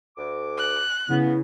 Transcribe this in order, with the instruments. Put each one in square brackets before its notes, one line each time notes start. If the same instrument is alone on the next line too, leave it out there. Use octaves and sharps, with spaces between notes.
[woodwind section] D2 D6
[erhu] F#6
[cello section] C#3 [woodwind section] B3 [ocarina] E4